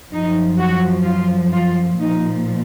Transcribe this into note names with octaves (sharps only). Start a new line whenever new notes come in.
F#2 F3 D#4
F#4
F4
F4
A#2 F3 D#4